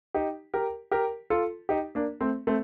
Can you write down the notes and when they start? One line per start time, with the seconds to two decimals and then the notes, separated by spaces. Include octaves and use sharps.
0.14 D#4 G4
0.54 G4 A#4
0.91 G4 A#4
1.30 F4 A4
1.69 D#4 G4
1.95 A#3 D4
2.21 A3 C4
2.47 A3 C4